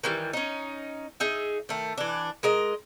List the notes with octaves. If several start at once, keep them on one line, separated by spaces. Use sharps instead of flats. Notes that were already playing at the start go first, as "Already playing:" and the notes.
D#3 E3 G3
C#4 D#4
D#4 G#4 E5
D#3 A3
E3 D4
G#3 A#4 D#5